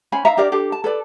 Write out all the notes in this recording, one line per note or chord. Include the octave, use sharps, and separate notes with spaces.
C#4 C5 G#5 B5
D#4 E5 F5 A#5
D4 G4 A#4 D5
D4 G4 A4
A5
A4 B4 D5